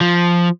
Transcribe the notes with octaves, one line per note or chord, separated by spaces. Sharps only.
F3